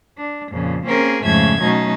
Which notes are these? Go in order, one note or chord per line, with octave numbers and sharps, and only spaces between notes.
D4
F2 A#2 C#3
A#3 C4 C#4 G#4 A#4
F2 G#2 C#3 A3 E5 G#6
B2 F#3 A3 C#4 D#4